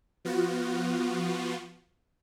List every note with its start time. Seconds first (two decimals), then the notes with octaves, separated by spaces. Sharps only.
0.25 F3 B3 F4 F#4